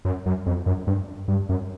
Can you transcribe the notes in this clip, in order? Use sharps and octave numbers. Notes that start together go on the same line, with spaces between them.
F#2
F#2
F2
F#2
G2
G2
F#2